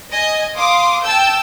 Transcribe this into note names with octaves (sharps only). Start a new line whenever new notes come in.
D#5 G#5
F5 C6 D6 D#6
G5 A5 E6 G6